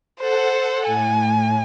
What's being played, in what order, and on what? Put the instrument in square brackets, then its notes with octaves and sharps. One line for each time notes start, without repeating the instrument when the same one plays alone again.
[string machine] A4 F#5 [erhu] C5
[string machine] A2 [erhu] G#5